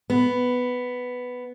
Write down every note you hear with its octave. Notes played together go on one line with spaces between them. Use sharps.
B3